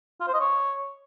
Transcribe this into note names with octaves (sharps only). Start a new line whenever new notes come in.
F4
C5
D#5
C#5